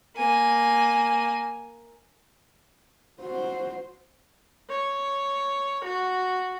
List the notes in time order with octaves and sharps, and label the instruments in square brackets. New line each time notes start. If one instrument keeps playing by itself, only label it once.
[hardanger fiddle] A#3 G#5
[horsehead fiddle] F#4 C5
[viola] C#5
F#4